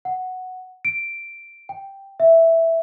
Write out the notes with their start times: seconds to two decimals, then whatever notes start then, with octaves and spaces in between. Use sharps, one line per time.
0.05 F#5
0.85 D7
1.69 G5
2.20 E5